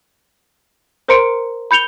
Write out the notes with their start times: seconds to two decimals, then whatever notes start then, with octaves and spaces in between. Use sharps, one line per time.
1.08 A#4 C5 A#5 C6 C#7 D7
1.71 B5 G6 C#7 F7 G7